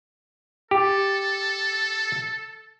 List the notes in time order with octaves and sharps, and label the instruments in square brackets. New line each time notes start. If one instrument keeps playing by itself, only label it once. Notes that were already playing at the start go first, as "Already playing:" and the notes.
[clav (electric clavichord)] G4 [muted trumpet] A4